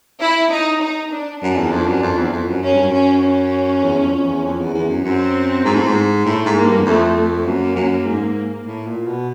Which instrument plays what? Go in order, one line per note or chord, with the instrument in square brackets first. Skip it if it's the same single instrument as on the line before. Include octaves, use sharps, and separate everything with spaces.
[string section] E4
D#4
D#4
D4
[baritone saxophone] F#2 [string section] D4
[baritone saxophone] E2
F2
F#2
F2
E2
F2
F#2
[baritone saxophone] F#2 [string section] C#4
[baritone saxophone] G2
F#2
[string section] C#4
C#4
[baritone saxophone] E2
F#2
F2
F2
E2
F2
E2
E2
F#2
[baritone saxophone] F#2 [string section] C4
[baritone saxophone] G#2
A2
G#2
[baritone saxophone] A2 [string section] A3
[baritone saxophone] G#2
[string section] A#3
[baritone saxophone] G2
E2
[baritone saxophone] F2 [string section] A3
[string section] A3
[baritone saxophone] F#2 [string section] A#3
[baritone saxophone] F#2
G#2
A2
A#2
B2